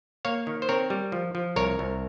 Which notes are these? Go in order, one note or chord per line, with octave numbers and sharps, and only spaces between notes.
A#3 C#5 F5
D#3
C5
C4 A#4 C#5
G3
F3
F3
C2 A#4 C#5
C2